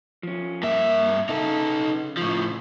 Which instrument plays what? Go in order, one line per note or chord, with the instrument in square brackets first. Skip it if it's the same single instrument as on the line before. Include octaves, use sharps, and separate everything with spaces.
[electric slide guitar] F3 C#4
[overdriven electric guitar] G2 E5 [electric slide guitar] A#3
[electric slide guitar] C#3 [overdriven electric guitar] D#4 A4
[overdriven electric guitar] A2 F3